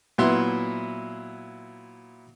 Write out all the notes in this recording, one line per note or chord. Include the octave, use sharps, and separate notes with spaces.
A#2 F#3 B3 E4 E5 C6